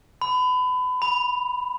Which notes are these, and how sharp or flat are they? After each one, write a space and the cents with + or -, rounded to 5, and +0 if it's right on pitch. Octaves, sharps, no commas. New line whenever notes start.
B5 +30
B5 -15